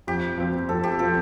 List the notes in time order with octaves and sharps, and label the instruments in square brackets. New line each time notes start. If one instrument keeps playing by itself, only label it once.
[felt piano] F2 [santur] G4
[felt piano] F3 C4 F4
[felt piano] F2 [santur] A4
[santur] G4
[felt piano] F3 C4 F4 [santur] A4